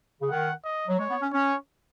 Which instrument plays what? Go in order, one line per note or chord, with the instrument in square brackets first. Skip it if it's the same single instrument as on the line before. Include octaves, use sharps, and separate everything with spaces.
[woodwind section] C#3
[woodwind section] D#3 [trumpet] F#5
[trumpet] D#5
[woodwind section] F#3
[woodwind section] G#3 [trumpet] C#5
[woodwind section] B3
C#4
[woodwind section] C#4 [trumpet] C#5